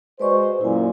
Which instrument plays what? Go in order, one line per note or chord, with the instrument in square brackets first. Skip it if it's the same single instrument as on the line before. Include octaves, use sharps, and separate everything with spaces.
[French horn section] G#3 F#4 C5 [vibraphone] B4 D5 C#6
[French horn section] F#2 A#2 [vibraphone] E4 G#5